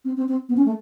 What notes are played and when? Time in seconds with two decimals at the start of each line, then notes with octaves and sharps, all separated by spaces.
0.05 C4
0.17 C4
0.28 C4
0.49 B3
0.57 C#4
0.66 A3